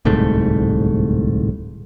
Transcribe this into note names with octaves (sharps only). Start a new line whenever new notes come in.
D1 C2 G#2 A3